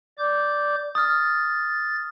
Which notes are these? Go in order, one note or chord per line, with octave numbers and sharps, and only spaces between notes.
D5 D6 G6
D#6 F6 A6